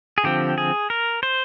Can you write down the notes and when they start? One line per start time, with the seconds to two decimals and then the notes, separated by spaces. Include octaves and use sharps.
0.18 G#4
0.24 D3 F3 C4 G4
0.58 G#4
0.90 A#4
1.23 C5